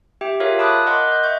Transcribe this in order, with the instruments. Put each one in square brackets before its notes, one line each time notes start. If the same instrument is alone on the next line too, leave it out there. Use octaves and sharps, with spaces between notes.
[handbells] G4 E5 G5
F4 G#4 A#4 C#5 E5 F5
F5 A5 B5 D6 D#6 F#6
A#4 D#5 F#5 C6 D6 F#6
D#5 G6
E5 C#6 G6